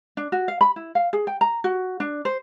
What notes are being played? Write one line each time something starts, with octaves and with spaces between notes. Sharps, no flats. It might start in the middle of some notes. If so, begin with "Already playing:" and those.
D4
F#4
F5
B5
E4
F5
G#4
G5
A#5
F#4
D4
C5